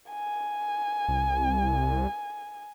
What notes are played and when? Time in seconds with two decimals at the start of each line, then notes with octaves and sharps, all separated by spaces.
0.10 G#5
1.09 C2